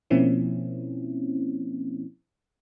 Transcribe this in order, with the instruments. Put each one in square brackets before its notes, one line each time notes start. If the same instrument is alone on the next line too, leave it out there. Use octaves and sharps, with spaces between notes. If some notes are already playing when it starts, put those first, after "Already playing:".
[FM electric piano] B2 F3 A#3 C4 C#4 E4